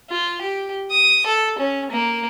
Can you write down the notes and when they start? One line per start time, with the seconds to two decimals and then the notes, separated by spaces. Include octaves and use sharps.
0.10 F4
0.42 G4
0.92 D#6
1.27 A4
1.59 C#4
1.91 A#3